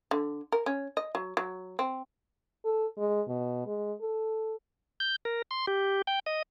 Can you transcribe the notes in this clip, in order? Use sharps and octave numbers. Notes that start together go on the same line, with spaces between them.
D3
A#4
C#4
D#5
F#3
F#3
C4
A4
G#3
B2
G#3
A4
G6
A#4
C6
G4
G5
D#5